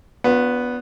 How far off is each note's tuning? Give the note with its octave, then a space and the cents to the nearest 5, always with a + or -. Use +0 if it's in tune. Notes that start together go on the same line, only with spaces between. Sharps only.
B3 +0 D4 -30 F4 +35